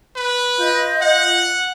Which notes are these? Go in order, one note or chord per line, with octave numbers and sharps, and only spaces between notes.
B4
F4 D#5 G6
F#5